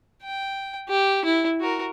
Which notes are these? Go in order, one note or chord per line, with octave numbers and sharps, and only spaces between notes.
G5
G4
E4
F#4 A#4